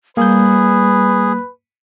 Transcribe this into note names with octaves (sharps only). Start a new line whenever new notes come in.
G3 A#3 G#4 B4 G6